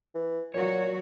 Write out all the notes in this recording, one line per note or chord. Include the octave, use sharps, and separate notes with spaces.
E3
A#2 F#3 F#4 C#5